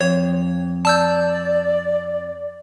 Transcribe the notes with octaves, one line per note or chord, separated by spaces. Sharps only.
F2 C#5
D5 A5 E6 G6